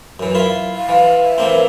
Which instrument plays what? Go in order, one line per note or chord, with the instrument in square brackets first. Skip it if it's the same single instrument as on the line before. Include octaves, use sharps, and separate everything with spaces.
[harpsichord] F#2 E3
E4 F4 E5
[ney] F5
[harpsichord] E3
[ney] E5
[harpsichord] E3 A#3 C4